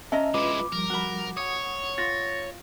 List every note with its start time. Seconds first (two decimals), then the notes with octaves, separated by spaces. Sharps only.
0.12 C#4 D#5 E5 A5 A#5
0.34 G#3 E4 F4 B4 B5 D6
0.72 F3 G3 A#4
0.90 F#4 B5
1.37 C#5 F#5 D#6
1.98 F4 A6 A#6